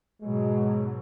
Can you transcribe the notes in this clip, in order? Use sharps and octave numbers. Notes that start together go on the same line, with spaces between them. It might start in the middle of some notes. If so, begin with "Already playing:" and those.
G#2 B2 F#3 G#3